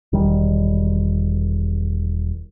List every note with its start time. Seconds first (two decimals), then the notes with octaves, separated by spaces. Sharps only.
0.13 E1 D#3 G3